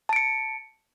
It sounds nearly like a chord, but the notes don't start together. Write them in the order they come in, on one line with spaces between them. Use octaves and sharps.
A5 D7 C#7